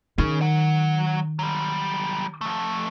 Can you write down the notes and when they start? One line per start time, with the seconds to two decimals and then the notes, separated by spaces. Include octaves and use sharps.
0.18 D#3 C#4 G#4
0.41 F#3 F#5
1.39 F#3 G3
2.41 F3 A3